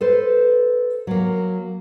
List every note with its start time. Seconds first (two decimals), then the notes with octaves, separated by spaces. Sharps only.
0.01 A4 B4 C5
1.07 F#3 A#3